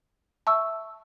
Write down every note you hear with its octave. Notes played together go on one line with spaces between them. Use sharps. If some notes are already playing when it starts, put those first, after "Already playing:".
E5 A5 C#6 E6